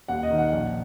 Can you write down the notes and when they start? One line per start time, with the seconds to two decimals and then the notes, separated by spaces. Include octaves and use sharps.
0.08 D#2 F#5
0.23 D#5
0.31 D#3
0.38 F#5
0.52 A#1